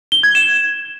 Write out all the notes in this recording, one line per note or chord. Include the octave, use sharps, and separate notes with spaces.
G7
G#6
E7